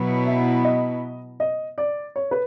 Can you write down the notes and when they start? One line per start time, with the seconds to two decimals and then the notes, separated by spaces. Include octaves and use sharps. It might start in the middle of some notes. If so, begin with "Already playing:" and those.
Already playing: B2 F#3 B3 E4
0.26 E5
0.64 D#5
1.40 D#5
1.78 D5
2.16 C#5
2.31 B4